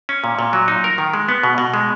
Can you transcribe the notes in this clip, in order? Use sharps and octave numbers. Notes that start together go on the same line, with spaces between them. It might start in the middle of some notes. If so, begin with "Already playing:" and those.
C#4
A#2
A#2
F#3
D#4
A#4
D#3
G#3
B3
B2
B2
G#3